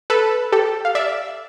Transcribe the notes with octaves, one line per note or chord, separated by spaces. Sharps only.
A4 B4
G4 A4
F5
D5 E5